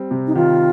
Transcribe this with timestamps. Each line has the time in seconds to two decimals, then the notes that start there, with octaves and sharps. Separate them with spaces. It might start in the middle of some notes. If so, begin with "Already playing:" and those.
Already playing: G3 C4
0.11 C3
0.27 D#4
0.35 D#3 F4